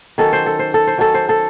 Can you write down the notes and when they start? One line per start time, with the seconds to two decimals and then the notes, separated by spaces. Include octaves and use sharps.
0.18 D#3 F#3 C#4 A4
0.33 C5
0.46 A4
0.59 C5
0.74 A4
0.87 C5
0.98 D#3 F#3 C#4 A4
1.14 C5
1.29 A4